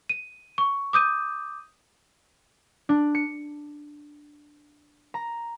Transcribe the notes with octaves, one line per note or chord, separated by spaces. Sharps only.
D#7
C#6
D6 D#6 G6 D#7
D4
C#7
A#5